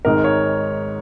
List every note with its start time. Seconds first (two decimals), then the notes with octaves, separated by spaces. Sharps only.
0.05 G#1 G#2 D#3 G#3 A#4
0.24 C#5